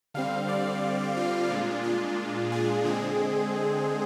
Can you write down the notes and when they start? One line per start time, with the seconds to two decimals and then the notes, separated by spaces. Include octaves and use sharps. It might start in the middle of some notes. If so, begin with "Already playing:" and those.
0.14 D3 G3 C4 F5
0.48 D5
1.16 F4
1.50 A#2 G#3 D4
1.83 F4
2.52 G#4
2.85 D3 G#3 C4